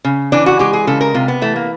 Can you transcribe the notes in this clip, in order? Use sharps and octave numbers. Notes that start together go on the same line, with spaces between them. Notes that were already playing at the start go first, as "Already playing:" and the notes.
C#3
E3 D4
F#4
G#3 G4
G#4
C#3 A4
A#4
C3 F4
B3
E3 A3
A#3